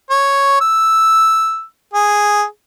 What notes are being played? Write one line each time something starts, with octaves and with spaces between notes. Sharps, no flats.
C#5
E6
G#4